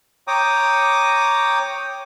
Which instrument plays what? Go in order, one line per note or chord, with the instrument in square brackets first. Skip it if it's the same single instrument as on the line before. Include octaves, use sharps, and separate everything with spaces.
[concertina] C#5 G5 A#5 D6 D#6